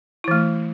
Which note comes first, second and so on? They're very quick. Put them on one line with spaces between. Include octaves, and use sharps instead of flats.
E4 E3 A3